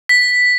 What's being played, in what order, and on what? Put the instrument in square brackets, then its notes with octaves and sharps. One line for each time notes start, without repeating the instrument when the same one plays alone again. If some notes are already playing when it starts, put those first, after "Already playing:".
[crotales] B6